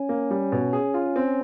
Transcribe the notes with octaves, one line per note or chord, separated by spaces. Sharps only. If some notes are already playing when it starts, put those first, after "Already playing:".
Already playing: C#4
A#3
G3
B2
G#4
F4
C4